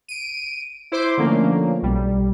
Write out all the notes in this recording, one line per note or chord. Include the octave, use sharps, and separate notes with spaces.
D7 D#7
E4 C5 C6 D6
D3 F3 A3 A#3 C#4
B1 G3